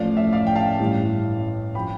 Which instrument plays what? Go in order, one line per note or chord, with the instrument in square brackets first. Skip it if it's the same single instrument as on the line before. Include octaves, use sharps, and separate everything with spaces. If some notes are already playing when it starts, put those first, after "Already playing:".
Already playing: [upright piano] A1 A2 F3 D5 F5
E5
D5 F5
G5
F5 A5
A1 G2 E3
F3 G5 B5